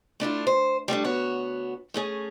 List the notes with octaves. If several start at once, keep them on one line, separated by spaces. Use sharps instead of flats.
A3 D4 E4 F4
C5
G3 A3 C4 D4
D2 B3 F#4 C#5
A3 C#4 G#4